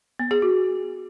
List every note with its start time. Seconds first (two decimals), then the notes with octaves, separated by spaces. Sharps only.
0.19 B3
0.31 G#4
0.42 F#4